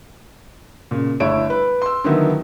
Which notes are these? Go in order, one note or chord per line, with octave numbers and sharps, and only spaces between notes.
A#2 C#3
G1 A3 E4 C#5 D7
B4
C6 E6
D3 D#3 F#3 B3 D#4 E4